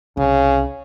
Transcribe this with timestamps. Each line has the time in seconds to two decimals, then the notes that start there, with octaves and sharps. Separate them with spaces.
0.17 C2 C#3